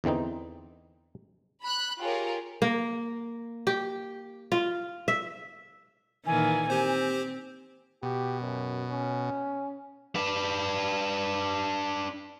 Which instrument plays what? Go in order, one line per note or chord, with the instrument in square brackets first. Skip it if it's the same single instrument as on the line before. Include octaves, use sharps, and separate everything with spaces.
[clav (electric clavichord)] E2 D3 E3 C4 D#4
[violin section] B5 F#6
F4 G4 G#4 A#4 C#5
[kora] A#3
G4
F4
E5
[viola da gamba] A#2 D#3 E3 [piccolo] G#5
[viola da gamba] C4 [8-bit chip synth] G4 C5
[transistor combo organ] B2 [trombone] G4
[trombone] F#2
C#4
[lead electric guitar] D4 B4